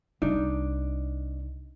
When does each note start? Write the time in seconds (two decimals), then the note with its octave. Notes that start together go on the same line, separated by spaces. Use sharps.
0.22 C2 D4 D#4